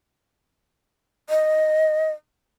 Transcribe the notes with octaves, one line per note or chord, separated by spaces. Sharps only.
D#5